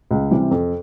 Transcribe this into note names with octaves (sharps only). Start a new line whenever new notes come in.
C#2
C3 E3 G3
F2